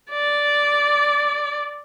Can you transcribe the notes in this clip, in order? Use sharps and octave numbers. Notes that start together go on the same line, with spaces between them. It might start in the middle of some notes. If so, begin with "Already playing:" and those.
D5